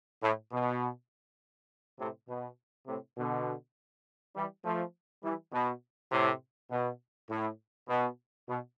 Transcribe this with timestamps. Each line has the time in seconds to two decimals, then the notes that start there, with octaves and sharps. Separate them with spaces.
0.22 A2
0.52 B2
1.99 A2 C3
2.28 B2
2.87 A2 C3
3.17 B2 D3
4.35 E3 G3
4.64 F3 A3
5.23 E3 G3
5.52 B2
6.12 A2 C3
6.70 B2
7.29 A2
7.88 B2
8.48 B2